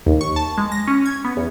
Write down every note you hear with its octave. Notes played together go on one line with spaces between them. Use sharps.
D#2
C#6
A5
G#3
A#6
C#4
G#6
B3
E2